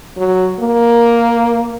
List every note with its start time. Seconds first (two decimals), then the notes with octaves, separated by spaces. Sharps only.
0.17 F#3
0.60 A#3